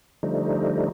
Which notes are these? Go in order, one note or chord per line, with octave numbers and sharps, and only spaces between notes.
D3 F3 G3 A3 D#4